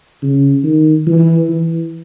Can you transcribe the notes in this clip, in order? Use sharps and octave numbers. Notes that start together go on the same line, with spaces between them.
C#3
D#3
E3
E3